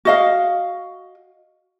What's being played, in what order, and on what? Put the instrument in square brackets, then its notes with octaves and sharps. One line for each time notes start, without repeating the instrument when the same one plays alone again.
[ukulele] F#4 D#5 F5